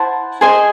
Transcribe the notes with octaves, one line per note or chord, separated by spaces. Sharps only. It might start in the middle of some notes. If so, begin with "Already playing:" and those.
Already playing: E4 C5 F#5 A5
G#4 C5 D#5 G#5